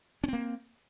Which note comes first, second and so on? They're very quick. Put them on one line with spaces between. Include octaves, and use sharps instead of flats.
C#4 C4 A#3